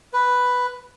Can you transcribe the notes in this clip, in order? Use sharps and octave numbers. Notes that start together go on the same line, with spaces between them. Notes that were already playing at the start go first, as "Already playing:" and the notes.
B4